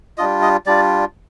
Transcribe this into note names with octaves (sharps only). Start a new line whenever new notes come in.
G3 D4 F4 D#5
D#5
G3 D4 F4 D5